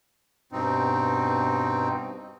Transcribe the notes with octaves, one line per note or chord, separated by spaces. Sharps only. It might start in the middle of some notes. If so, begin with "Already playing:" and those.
G2 B2 C4 D#4